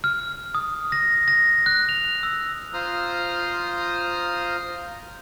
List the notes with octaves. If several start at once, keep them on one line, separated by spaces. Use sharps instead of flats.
F6
D#6
A#6
A#6
F#6
F7
E6
F4 C5 A#5 D#6 F6